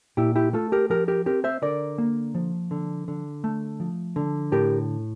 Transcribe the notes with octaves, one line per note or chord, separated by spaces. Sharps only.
A#2 E4 G4
E4 G4
A3 F4 A4
G4 A#4
F3 G4 A#4
G4 A#4
C4 G4 A#4
C5 E5
D3 A#4 D5
A#3
F3
D3
D3
A3
F3
D3
A2 G4 A#4